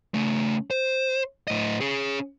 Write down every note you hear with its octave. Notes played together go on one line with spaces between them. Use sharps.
C#3 A3
C5
A2 D#5
C#4 G#4